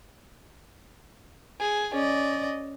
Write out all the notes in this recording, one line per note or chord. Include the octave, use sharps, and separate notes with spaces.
G#4
C#4 D5 D#5